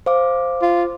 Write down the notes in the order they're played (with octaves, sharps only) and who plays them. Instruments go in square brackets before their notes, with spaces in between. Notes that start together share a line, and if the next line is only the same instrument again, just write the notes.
[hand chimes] C5 F5 D6
[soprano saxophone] F4